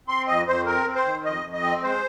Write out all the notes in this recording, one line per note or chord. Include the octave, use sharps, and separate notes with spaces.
C4 C6
F2 D#5
F2 C5
C4 A#4
C4
C5
D#3
F2 D#5
F2
D#5
C4
G#3 C5